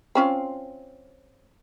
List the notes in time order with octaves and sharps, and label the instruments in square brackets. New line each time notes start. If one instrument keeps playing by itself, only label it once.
[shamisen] C4 C#4 F4